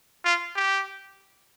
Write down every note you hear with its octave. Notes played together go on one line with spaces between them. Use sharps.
F4
G4